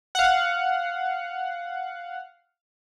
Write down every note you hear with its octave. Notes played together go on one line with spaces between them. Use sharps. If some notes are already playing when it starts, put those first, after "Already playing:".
F5 F#5